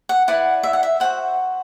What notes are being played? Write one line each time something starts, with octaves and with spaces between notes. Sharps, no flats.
F#5
E4 B4 D5 F#5
E5
F#5
E5
F#4 C5 F#5